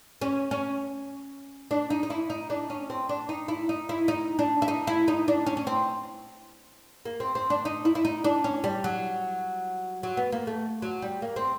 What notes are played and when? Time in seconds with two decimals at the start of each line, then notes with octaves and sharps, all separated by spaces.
0.21 C#4
0.51 C#4
1.71 D4
1.90 D#4
2.03 D#4
2.10 E4
2.30 D#4
2.50 D4
2.70 C#4
2.90 C4
3.09 D4
3.29 D#4
3.48 E4
3.69 D#4
3.89 E4
4.08 D#4
4.39 D4
4.62 E4
4.68 D#4
4.87 E4
5.08 D#4
5.28 D4
5.46 C#4
5.57 C#4
5.67 C4
7.05 A#3
7.20 C4
7.35 C4
7.50 D4
7.65 D#4
7.85 E4
7.95 E4
8.05 D#4
8.24 D4
8.44 C#4
8.64 G3
8.84 F#3
10.03 F#3
10.17 B3
10.32 A#3
10.47 A3
10.82 F#3
11.02 G3
11.22 A#3
11.36 C4